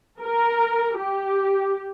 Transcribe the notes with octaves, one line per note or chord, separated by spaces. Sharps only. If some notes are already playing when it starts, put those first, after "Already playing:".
A#4
G4